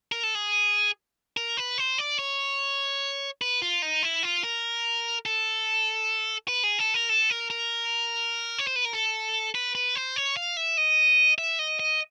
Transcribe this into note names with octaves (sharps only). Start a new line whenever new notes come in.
A#4
A4
G#4
A#4
B4
C5
D5
C#5
B4
F4
D#4
E4
F4
A#4
A4
B4
G#4
A4
A#4
A4
A#4
A#4
C#5
C5
B4
A#4
A4
B4
B4
C5
C#5
F5
E5
D#5
E5
D#5
D#5